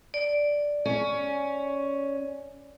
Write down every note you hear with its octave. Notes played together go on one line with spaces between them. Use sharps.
D5
C#4